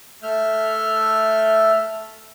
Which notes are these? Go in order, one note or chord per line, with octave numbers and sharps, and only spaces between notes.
A3 E5 F6 G6